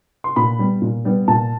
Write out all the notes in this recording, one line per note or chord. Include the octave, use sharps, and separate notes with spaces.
C6
A#2 B5
G3 B3
A#2
G3 B3
A#2 A5